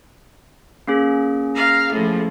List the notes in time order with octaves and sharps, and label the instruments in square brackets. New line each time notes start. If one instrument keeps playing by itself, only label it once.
[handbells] A#3 C#4 G#4
[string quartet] F5 A#5
A2 F3